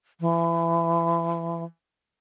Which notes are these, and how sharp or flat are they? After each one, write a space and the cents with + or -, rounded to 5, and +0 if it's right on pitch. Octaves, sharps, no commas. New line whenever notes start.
E3 +30